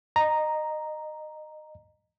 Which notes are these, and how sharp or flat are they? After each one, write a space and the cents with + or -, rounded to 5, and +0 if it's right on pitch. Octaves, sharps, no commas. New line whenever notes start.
D#5 -20 A#5 +0